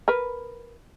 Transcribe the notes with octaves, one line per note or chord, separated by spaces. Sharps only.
A#4 B4